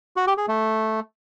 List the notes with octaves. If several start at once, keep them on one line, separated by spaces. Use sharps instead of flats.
F#4
G4
G#4
A3